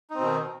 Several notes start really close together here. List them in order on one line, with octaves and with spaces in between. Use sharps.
D#4 C4 B2 D#3